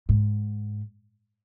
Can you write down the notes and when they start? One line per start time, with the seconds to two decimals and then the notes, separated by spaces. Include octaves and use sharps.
0.09 G#2